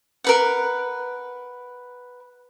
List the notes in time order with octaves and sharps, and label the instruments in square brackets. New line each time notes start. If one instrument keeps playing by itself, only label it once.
[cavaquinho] A#4 B4 F#5